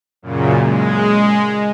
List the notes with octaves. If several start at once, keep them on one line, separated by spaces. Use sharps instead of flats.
F#2 A#2 C#3
G#3